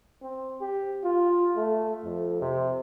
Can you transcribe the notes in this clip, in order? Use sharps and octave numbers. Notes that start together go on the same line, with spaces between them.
C4
G4
F4
A3
F2
C3